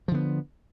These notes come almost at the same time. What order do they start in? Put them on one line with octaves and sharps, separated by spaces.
F3 D3 B3